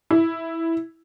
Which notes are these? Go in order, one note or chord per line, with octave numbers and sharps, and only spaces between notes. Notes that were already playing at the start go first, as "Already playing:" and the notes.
E4